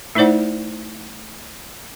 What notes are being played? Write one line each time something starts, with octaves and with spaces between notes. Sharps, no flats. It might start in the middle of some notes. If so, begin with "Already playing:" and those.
A3 D#4 E4 C5 D5 F#5